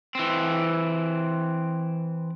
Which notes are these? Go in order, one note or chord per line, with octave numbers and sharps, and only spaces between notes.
E3 C4